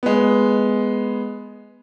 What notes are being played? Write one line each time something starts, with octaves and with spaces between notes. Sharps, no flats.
G#3 B3